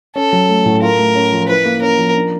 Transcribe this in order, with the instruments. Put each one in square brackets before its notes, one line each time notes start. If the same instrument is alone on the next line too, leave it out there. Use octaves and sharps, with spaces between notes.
[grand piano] C#4 [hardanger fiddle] A4
[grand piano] F#3
A3
A2
[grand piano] F4 [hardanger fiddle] A#4
[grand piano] A3
C#4
F3
[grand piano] E4 [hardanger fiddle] B4
[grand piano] A#3
[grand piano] C#4 [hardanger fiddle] A#4
[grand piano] F3
D4